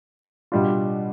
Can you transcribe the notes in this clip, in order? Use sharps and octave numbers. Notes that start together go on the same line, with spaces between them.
B2 G3 D4 F4